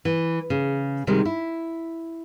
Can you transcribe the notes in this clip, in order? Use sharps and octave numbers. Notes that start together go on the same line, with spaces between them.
E3
C#3
C3 D#3 G3 G#3 A#4
E4